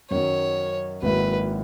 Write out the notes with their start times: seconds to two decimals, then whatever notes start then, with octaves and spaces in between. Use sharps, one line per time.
0.11 F#2 D#3 F#3 C#5
1.02 G#1 G#2 F#3 A#3 E4 B4